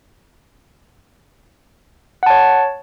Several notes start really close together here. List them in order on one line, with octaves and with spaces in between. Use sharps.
F#5 A5 C#5